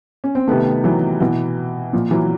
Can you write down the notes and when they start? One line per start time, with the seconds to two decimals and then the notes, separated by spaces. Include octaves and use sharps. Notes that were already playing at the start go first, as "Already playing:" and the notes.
0.24 C#4
0.35 C4
0.47 C3 D#3 A3 B3
0.84 E3 F#3
1.20 B2 E3
1.93 A#2 F3
2.11 E3 F#3